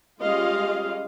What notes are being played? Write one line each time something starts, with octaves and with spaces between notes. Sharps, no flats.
G3 G#3 C#4 F4 D#5 F5